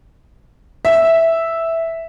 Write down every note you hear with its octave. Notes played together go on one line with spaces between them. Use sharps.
E5